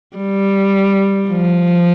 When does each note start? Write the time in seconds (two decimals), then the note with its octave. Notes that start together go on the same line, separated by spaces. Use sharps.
0.16 G3
1.29 F3